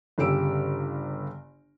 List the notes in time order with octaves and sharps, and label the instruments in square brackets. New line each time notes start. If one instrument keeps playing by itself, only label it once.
[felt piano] G1 C#3 G4 E6 D7